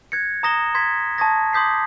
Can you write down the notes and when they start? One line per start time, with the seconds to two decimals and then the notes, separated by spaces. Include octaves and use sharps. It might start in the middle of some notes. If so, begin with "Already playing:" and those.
0.12 F#6 G#6 A#6 C#7
0.43 A#5 D#6 A#6 E7 G7
0.75 C6 G#6 B6
1.18 A5 C#6 D#6 G#6 A#6
1.53 C6 D6 D#6 G6 B6 C7